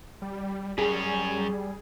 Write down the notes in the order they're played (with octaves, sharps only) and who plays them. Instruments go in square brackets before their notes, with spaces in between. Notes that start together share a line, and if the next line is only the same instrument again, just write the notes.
[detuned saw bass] G3
[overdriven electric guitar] F#2 C#4 [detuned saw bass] G3 [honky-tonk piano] G#4